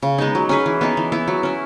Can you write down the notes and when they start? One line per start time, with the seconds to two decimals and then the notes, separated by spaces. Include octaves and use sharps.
0.02 C#3
0.18 G#3 B3 D#4
0.35 F#3
0.49 C#4 G#4 B4
0.66 E3
0.81 B3 D#4
0.97 E3
1.12 B3 E4
1.28 F#3
1.43 C#4 E4